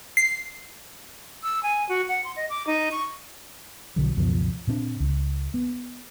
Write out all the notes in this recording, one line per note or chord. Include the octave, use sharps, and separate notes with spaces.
C7
E6
G#5
F#4
F#5
C6
D#5
D6
D#4
C#6
B1 D3 F#3
C#2 F#2 B2 F3
A#2 C4 D4
C#2
B3